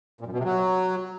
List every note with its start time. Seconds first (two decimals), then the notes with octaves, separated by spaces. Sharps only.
0.21 A#2
0.27 F#2
0.33 B2
0.38 C3
0.44 F#3